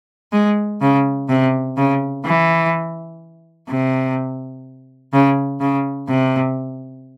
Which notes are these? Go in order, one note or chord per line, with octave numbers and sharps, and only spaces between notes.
G#3
C#3
C3
C#3
E3
C3
C#3
C#3
C3